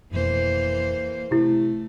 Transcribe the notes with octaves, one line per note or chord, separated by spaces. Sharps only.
F1 F2 B2 E3 A#3 C5
C3 A3 E4 G4